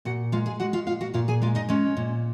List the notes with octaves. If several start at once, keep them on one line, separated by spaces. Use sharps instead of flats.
A#2 F#4 F#5
G#3 F4 F5
G#4 G#5
G#3 F#4 F#5
F4 F5
A#2 F4 F5
F#4 F#5
A#2 F4 F5
G#4 G#5
G#3 F4 F5
D#4 D#5
G#3 C#4 C#5
A#2